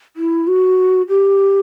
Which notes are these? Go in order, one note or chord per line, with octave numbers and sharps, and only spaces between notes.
E4
F#4
G4